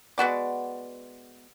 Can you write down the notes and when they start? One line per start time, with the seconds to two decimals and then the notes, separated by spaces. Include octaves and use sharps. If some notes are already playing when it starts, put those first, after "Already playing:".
0.18 G#3 B3 F#4 D5